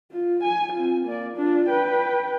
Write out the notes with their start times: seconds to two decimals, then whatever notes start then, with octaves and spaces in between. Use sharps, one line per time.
0.12 F4
0.43 G#5
0.73 C4 F4
1.06 A#3 D5
1.36 D4 F4
1.69 B4 G5